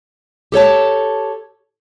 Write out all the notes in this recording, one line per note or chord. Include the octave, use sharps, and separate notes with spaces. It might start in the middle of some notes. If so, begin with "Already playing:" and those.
G4 A4 C#5 A5